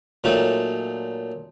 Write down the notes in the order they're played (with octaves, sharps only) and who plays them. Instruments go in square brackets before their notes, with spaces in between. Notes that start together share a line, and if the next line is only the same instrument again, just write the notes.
[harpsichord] A#2 F#3 A3 C#4 D#4 A4